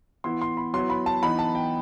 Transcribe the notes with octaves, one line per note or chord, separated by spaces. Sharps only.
E3 B3 E4 C6
C6
B5
F#3 B3 E4 C6
B5
A5
E3 B3 D#4 B5
A5
G5